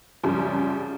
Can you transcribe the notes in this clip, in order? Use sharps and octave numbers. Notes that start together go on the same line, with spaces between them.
C2 F#2 C#3 F3